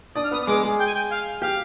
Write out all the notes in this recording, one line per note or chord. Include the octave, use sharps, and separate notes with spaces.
D4 D5 D#6
F6
B3 B4 D#6
D#6
G#3 G#4 D6
G#3 G#4
G5
G#5
G5
F5
G4 F5